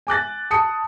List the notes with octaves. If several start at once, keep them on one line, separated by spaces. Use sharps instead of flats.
G#5 D6 F#6 A6
A5 D#6 C#7